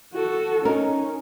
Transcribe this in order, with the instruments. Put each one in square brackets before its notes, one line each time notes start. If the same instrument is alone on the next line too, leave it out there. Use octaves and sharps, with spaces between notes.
[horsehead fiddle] F#4 A4
[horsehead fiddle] C#4 [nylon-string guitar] D#4 A#4